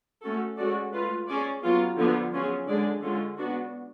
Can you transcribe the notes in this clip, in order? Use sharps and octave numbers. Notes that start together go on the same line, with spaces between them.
A3 C#4 F#4 A4
G#3 C#4 F#4 A4 D5
A3 F4 B4
C#4 G#4 D5
F#3 B3 F4
D3 F3 B3 D4
F#3 C#4 F4 G#4
D3 G#3 D4 G#4 D5
D3 G#3 C#4 F4
B3 D4 F#4